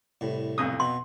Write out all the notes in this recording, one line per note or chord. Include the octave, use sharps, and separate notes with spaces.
C2 A2
B1 F2 D#6
B2 C6